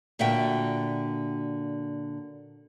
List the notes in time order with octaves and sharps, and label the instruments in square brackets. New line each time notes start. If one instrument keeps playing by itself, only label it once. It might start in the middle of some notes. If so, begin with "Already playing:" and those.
[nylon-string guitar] A#2 D3 F#4 E5 G5